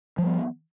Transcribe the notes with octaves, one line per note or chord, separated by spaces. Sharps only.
F3 G3 B3